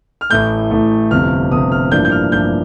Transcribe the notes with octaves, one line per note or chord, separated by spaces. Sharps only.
F6
A1 A2 A3 G6
A1 A2 A3
G1 F2 C3 F6
G1 F2 C3 D#6
F6
A1 G2 F3 A#3 D4 G6
G6
F6
A1 G2 F3 A#3 D4 G6